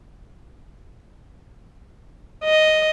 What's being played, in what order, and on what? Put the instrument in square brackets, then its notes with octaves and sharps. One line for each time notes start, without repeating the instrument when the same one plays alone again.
[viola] D#5